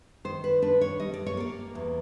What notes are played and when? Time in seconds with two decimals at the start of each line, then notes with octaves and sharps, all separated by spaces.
0.24 D#3 C5
0.44 B4
0.62 D4 B4
0.81 C#5
1.00 G3 D#5
1.14 D5
1.27 C#5
1.37 A#3 D5
1.75 E2